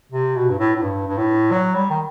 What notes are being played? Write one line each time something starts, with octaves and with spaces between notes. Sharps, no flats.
C3
B2
G2
A2
A2
G2
G2
A2
F#3
G3
D#3